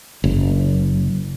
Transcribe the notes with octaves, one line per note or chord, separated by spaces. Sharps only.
F#1